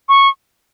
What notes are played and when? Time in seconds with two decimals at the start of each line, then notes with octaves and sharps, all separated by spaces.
0.09 C#6